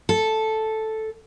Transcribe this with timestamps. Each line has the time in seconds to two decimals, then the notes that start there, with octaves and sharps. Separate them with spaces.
0.09 A4